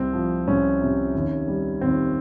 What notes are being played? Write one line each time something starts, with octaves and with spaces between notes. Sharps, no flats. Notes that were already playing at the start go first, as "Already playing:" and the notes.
Already playing: C2 C4
F3
C2 C#4
C3
D#2
G3
D#2 C4